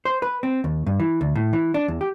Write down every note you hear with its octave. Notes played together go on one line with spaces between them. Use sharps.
C5
B4
C4
D#2
G2
E3
D2
A2
E3
D4
E2
G4